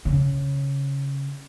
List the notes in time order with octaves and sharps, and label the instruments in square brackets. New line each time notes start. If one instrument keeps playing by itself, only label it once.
[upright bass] C#3